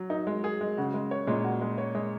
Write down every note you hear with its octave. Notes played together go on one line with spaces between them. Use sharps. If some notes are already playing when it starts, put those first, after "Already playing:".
Already playing: F#3
D#4
G#3
G#4
G#3
C#3 F#4
G#3
C#5
A#2 G#3
F#4
G#3
C#5
G#3